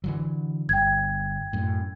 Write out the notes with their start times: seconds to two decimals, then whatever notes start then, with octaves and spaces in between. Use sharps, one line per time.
0.04 D3 E3 F#3
0.69 G1 G5 G#6
1.53 F#2 A2